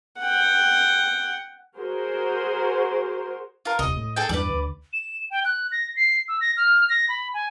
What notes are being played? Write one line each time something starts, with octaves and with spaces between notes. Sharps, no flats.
F#5 G5
F#4 G#4 A#4 C5
F4 A#4
D#1 C2 D#5
A2
G#4 A4 G5
E2 G2 B4 D5
D2
E7
G5
F#6
A#6
C7
E6
A#6
F6
A#6
B5
G#5